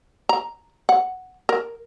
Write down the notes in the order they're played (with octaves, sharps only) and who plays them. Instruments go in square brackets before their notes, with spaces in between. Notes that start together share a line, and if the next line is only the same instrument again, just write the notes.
[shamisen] A#5
F#5
A#4